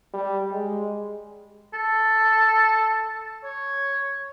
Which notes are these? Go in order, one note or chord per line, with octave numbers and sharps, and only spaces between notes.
G3
G#3
A4
C#5